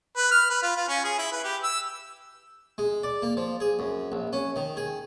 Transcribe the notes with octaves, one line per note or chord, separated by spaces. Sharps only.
B4
F6
B4
F4
F4
C#4
G#4
E4
B4
G4
E6
G#3
D5
A#3
F3
G#4
F#2
A#1
C#4
D#3
G#4